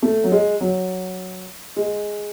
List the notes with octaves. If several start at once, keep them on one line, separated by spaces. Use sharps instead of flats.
A3
F#3
G#3
F#3
G#3